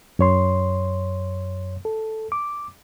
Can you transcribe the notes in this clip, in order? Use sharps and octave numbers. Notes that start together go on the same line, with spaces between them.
F#2 C#5 C6
A4
D6